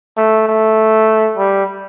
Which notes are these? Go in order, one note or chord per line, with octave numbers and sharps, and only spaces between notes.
A3
A3
G3